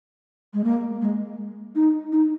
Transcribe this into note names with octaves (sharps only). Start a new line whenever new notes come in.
G#3
A#3
G#3
D#4
D#4